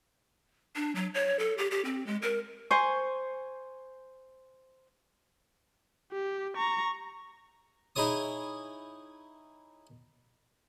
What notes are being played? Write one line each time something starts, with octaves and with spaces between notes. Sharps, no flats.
D4
F#3
C#5
A4
G4
G4
C4
G#3
A#4
C5 G#5 C#6
G4
A#5 C#6
D#4 E4 G#4 C#5 D#6